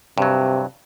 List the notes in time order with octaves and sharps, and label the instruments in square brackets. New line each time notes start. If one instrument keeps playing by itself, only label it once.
[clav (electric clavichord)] G2 F#3 [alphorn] C3